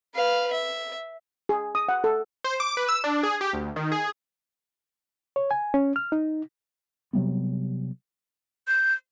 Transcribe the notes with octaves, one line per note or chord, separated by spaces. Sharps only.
B4 F5
E5
G#4
D#6
F#5
A4
C5
D6
B4
E6
D4
G#4
G4
D2
D#3
G#4
C#5
G#5
C#4
F6
D#4
C3 F#3 G3 B3
G6